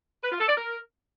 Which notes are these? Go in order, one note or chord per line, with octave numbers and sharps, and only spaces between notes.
B4
F4
A4
D5
A#4